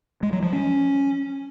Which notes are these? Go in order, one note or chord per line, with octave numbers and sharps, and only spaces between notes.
G#3
F#3
F3
C#4